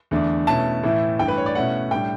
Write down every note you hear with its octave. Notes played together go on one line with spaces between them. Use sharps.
E2 D3 A3 D4
B2 A3 C#4 E4 A5
A2 E3 A3 E4
G2 E3 A3 G5
B4
C#5
D5
B2 A3 C#4 E4 F#5
A2 G3 D4 G5